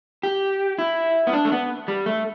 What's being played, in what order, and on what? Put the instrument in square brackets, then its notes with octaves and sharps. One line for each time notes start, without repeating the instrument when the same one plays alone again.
[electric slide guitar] G4
E4
B3
D4
A3
B3
G3
A3